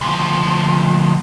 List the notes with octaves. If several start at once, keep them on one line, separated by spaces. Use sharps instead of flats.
D2 F3